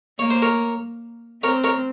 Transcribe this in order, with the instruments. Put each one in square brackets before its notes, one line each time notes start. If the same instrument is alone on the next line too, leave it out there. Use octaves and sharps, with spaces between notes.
[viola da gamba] A#3 [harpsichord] C#5
[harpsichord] C5
A#4 C#5
[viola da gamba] C4 [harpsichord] A#4 C#5
[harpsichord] A#4 C#5